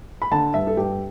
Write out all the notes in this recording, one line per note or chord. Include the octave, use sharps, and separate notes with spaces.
B5
D3 A5
G2 E5
A4
G2 G4